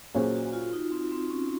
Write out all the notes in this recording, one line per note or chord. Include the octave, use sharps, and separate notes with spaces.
A#2 F#3 C#4 F#4 G#4 C5
F#4
F4
D#4
C4
C4
C#4